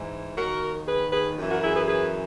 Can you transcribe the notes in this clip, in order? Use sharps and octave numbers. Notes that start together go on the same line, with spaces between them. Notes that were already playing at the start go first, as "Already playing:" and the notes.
Already playing: G#2 E3
D#2 D#3 F#4 A#4
G#4 B4
G#4 B4
F#2 E3
F#4 A#4
E4 G#4
G#4 B4
G#4 B4